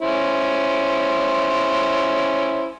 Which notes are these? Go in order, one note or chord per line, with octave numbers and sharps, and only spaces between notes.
C#4 E4 C5